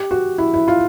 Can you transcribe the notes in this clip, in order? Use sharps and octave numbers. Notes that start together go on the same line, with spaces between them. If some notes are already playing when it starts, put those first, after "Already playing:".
Already playing: G4
F#4
E4
E4
F4